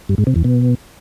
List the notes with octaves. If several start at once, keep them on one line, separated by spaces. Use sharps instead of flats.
G2
G#2
C3
E2
B2